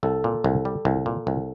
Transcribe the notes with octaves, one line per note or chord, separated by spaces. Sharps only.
C2 A4
A#2
C2
G3
C2
A#2
C2